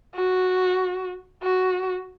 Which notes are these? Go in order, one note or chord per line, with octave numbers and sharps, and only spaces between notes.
F#4
F#4